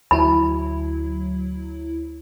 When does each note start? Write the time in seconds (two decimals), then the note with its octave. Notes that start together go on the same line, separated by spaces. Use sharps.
0.11 D2 F#3 E4 B5